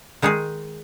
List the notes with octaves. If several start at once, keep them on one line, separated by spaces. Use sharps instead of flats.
D#3 G#3 D#4 G#4